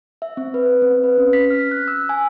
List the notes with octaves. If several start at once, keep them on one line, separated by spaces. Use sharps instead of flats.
E5
C4
B4
C4
B4
C#4
B6
F6
F#6
E6
G#5